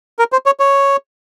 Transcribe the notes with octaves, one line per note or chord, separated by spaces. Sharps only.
A#4
C5
C#5
C#5